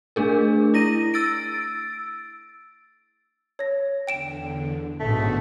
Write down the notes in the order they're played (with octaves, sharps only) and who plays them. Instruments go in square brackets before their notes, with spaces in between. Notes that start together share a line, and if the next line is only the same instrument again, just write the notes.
[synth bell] A3 D4 G#4 A#4
E4 A#6 D#7
E6 A6 D7
[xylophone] C#5 A#6
[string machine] E2 D3 [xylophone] G5 D7 E7
[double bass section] A1 G#2 [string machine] D3 B3 F#4 [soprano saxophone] A3